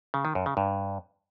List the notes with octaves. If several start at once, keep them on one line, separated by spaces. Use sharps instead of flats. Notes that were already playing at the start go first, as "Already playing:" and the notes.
C#3
D#3
F#2
C#3
G2